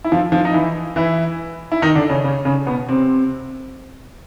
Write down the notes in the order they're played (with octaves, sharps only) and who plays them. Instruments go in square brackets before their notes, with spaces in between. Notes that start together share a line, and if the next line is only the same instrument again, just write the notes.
[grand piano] E4
F3 F4
F3 F4
D#4
E3 E4
E3 E4
E4
D#3 D#4
D3 D4
C#3 C#4
C#3 C#4
C#3 C#4
B2 B3
C3 C4